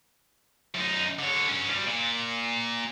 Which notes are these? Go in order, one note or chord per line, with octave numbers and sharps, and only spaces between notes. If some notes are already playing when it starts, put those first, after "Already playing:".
F#2 D#4
D3 C#5
G2 C#4
B2 G3
A#2